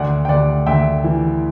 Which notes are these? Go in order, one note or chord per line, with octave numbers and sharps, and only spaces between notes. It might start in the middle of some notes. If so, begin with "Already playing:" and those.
Already playing: D2 D5 F#5
G5
D2 D5 F#5
D2 E5 G5
E3